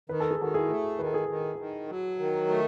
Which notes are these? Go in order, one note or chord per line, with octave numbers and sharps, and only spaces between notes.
D#3 B4
A4
G#4
D#3 F#4 A4
E4 G#4
A3
D#3 B4
A4
G#4 B4
D#3
D#3
F#3
D#3
A3